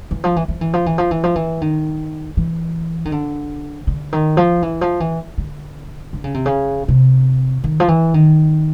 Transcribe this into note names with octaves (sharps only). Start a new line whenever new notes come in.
E3
F3
E3
F3
E3
F3
E3
F3
E3
F3
E3
D#3
E3
D#3
D3
D3
D#3
F3
E3
F3
E3
D3
D3
C#3
C3
C#3
C3
D#3
F3
E3
D#3